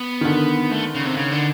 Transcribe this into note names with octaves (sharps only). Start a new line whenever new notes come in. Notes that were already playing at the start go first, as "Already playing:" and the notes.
Already playing: B3
D#3
D3
A3
C#3
C3
C#3
D3